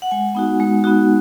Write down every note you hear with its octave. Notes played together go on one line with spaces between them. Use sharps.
F#5
G#3 G#5
B3 D#4 F#4
G#3
B3 D#4 F#4